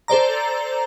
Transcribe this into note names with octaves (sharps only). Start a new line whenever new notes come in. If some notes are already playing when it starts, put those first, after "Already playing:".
A4 C5 D5 A#5